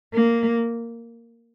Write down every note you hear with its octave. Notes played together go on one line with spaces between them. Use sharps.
A#3